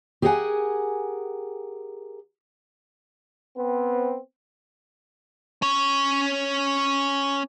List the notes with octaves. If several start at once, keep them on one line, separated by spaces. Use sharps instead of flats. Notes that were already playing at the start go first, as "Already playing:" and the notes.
G4 G#4 A#4 D5 F#5 G#5
B3 C4
C#4 C#5